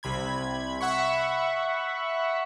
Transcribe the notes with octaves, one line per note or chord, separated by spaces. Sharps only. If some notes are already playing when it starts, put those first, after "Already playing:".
C2 C3 B5 G#6
E5 F#5 B5 C#6